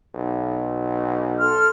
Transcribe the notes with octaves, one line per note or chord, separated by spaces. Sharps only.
B1
A4 C6 F6